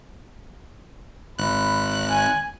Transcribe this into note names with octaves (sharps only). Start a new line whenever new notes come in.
G#1 B5 F#6
G#5